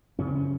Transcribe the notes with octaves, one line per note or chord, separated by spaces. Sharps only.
F#2 C#3 C#4
C4
C#4